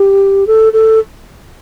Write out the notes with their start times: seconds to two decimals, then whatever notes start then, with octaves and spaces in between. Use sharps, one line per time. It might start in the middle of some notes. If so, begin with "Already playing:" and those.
Already playing: G4
0.47 A4
0.73 A4